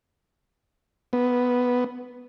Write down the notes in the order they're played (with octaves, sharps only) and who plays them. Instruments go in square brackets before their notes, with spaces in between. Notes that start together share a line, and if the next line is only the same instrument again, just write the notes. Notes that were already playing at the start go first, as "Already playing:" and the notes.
[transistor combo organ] B3